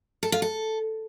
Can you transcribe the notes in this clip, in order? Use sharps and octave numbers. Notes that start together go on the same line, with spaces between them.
A4
F4
A4